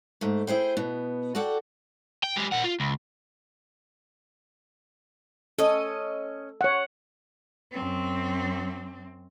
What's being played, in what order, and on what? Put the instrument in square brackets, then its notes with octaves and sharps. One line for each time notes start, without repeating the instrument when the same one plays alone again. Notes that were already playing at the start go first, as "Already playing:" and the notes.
[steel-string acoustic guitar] G#2 A3
E4 G#4 C5 G5
B2 B3
F#4 A4 D5 F#5 G5
[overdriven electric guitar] G5
G#3 G4
A#2 F#5
F4
C#2
[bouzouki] C#4 D#5 [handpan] A4
[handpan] C#5 F#5
[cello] F#2 C4